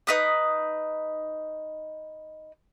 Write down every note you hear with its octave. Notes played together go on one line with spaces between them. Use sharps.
D#4 B4 D#6